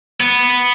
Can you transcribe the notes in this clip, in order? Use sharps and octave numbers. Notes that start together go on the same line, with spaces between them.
B3